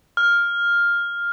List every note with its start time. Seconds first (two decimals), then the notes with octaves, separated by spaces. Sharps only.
0.17 F6